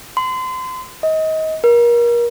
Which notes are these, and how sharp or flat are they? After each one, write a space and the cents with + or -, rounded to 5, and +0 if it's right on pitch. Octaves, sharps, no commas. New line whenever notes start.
C6 -30
D#5 +25
A#4 +30